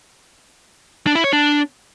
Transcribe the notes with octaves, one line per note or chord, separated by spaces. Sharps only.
D4
E4
C#5
D4